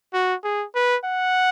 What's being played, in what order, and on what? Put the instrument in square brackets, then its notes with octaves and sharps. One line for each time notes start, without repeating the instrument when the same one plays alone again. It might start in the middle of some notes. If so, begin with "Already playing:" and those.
[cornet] F#4
G#4
B4
F#5